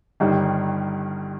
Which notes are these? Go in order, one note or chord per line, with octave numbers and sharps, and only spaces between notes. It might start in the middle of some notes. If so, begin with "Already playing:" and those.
G1 G2 D#3 G3